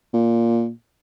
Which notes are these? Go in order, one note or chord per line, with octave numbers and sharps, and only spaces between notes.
A#2